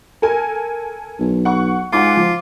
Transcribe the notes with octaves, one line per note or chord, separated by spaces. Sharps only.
A4 A#4 G#5
B1
F#5 C#6
G#2 F4 F#5 G#5 D6
F3